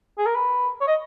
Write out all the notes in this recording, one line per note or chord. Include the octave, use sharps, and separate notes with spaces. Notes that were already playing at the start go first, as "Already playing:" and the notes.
G#4
A#4
B4
C#5
D#5